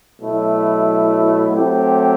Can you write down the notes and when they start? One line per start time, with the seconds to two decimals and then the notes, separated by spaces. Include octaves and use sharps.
0.21 B2 F#3 A3 E4
1.50 F#3 A3 C4 G4 C5